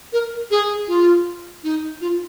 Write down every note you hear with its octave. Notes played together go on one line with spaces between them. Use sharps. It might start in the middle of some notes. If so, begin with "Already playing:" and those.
A#4
G#4
F4
D#4
F4